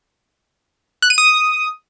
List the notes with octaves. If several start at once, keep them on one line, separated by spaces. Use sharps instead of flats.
F#6
D#7
D#6